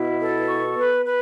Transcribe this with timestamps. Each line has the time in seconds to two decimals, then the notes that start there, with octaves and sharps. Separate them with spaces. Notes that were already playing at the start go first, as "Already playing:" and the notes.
Already playing: B2 E4
0.20 A4
0.48 C#6
0.77 B4
1.05 B4